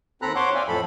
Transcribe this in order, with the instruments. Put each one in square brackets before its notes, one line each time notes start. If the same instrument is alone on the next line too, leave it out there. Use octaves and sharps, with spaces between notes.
[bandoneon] D#2 C4 A4 A#5 B5 F#6
C5 C#5 F#5 C6 D6
D5 E5 F5 G5 G#5
F2 A2 F3 A4 B5